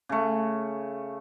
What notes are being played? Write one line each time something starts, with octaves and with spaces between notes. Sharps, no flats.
C#3 A3